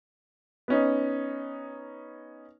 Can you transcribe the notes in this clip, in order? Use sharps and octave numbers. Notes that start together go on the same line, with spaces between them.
B3 C#4 D#4